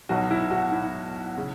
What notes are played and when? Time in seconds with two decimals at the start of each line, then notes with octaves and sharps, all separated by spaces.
0.09 B1 B2 F#3 F#4
0.31 E4
0.51 F#4
0.72 E4
1.38 C#3